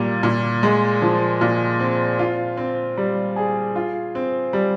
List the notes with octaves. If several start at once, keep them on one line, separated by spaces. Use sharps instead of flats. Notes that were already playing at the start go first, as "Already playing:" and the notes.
Already playing: A#2 G3 A#3
A#2
G#3
F3
A#2
C4
F4
C4
G3
G#4
F4
C4
G3